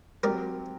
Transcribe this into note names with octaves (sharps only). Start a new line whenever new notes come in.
F#3 C4 G4 A#4 D5